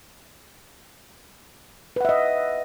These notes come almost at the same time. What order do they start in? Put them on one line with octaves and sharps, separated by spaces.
B4 F#5 E5 D#5